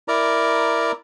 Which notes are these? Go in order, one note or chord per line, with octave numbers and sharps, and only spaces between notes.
E4 A#4 D5 A#5